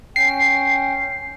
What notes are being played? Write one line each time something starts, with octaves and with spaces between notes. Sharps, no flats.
C#4 G5 C7